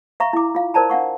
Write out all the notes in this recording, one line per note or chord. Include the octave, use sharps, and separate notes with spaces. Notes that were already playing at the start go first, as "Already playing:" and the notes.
E5 F5 A#5 C#6
E4 D6
F4 F5
A#4 C5 D5 A5 A#5
D4 F5 F#5 C#6